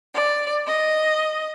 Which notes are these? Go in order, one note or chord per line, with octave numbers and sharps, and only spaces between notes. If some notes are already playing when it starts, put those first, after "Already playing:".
D5
D#5